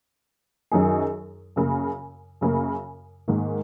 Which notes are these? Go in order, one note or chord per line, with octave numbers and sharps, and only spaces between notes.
F#2 D#3 F#3 D#4 G#4
F#2 C#3 A#3
F#2 C#3 A#3
G#2 D#3 A#3